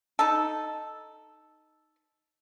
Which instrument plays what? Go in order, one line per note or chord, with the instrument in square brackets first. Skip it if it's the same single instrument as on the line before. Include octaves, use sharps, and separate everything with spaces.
[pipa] D#4 A4